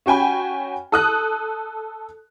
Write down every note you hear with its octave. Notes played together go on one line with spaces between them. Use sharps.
C#4 F#4 G5 G#5 B5
A4 D#6 F#6